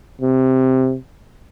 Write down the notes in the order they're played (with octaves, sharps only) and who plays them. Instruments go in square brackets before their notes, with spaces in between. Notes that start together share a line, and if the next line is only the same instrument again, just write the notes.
[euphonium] C3